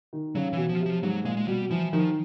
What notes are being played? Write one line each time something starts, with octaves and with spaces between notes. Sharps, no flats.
D#3
C#3 F#3
B2 E3
F3
C3
F3
G#2 F#3
A#2 G#3
G#3
B2 G3
E3 F3
D#3 F3